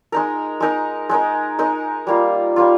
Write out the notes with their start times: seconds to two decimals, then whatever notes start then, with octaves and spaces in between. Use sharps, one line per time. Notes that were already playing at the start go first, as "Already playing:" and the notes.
0.12 G#3 D#4 A#4
0.60 G#3 D#4 A#4
1.09 G#3 D#4 A#4
1.59 G#3 D#4 A#4
2.07 G3 A#3 F4
2.56 G3 A#3 F4